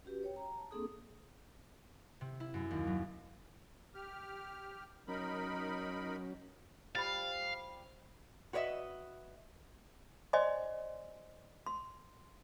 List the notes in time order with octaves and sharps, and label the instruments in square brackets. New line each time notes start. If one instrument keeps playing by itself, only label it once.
[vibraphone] C#4 F#4 G4 B4
C#5 G5
A#5
A5
A#3 C4 D4 G#4 A4 D#6
[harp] C3
E4
F#2
D#2
F#3
[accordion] G4 F6
[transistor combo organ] F#3 C#4 [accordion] D#4 A#4 B5
[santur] F3 G3 G5 [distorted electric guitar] F5 [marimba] B5 A6
[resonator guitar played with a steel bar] F#4 B4 C#5 D#5 E5
[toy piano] C5 D5 D#5 G#5 C6
C6